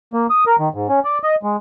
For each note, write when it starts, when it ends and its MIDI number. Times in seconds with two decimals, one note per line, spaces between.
0.14 0.27 58
0.30 0.44 87
0.47 0.56 70
0.59 0.69 51
0.74 0.87 44
0.89 1.00 61
1.05 1.18 74
1.23 1.35 75
1.43 1.56 56